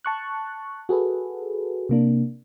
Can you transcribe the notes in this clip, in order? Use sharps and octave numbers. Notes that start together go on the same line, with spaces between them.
A5 C#6 F#6
F#4 G#4 A4 B4
C3 A#3 D4